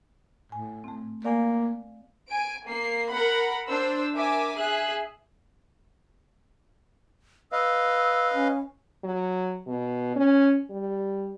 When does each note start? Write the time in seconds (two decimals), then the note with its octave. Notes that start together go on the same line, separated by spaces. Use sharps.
0.52 A2 G#5
0.84 A3 C4
1.25 A#3 D5 F5 G#5
2.29 G#5 D7
2.66 A#3 C7
3.10 A#4 F#5 B5
3.68 D4 C5 E6
4.14 A#4 E5 G#5 D6
4.57 G#4 E5 F#6
7.52 B4 D#5 F5 E6
8.34 C#4
9.04 F#3
9.67 B2
10.16 C#4
10.70 G3